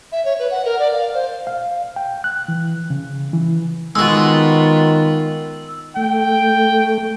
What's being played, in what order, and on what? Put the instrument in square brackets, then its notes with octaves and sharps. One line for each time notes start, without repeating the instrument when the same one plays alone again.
[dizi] E5
C#5
B4
F#5
A#4
D5
F5
C5
[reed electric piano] F5
G5
F#6
E3
C#3
E3
[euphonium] D#3 [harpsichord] G#3 F#4 [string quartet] B3 F4 [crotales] E6
[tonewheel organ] A3 [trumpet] G5